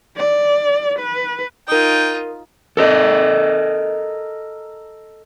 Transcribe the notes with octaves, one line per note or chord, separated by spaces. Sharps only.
D5
B4
D#4 F4 A#4 G5 D#6
A4 A#4 D#5